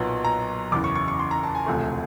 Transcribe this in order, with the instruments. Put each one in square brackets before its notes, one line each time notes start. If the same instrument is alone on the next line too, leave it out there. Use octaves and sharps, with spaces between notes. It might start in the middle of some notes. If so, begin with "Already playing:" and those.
Already playing: [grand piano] B1 A#2 F#3 B3
A#5
F#1 E2 C#3 E3 D6
C#6
C#6
C#6
C6
A#5
A5
G#5
E1 D2 C3 F3 A3